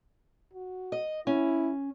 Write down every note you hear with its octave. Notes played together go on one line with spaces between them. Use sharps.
F#4
D#5
C#4 E4